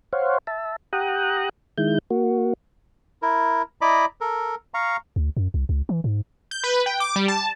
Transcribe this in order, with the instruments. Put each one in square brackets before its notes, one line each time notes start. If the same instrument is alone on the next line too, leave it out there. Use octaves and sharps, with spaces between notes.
[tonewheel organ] C5 C#5 F5 F#5
E5 A5
G4 F#5 G5 A#5 D#6 F#6
D#3 G#3 E4 G6
A#3 F#4
[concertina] E4 A#4
E4 D5 D#5 A#5 B5 D6
A4 A#4
F5 A#5 C#6
[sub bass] D2
F#2
C2
C#2
E3
G#2
[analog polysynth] G6
B4
G5
D6
G3
A5